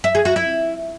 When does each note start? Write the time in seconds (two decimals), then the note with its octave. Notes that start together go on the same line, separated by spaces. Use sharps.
0.04 E5
0.15 G#4
0.25 F#4
0.36 E4